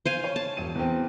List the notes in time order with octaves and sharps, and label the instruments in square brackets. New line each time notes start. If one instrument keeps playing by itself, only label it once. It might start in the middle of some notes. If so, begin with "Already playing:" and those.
[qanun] C5 F5 G#5
[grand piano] C#5
[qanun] A5
[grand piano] E1 D#7
E2 C4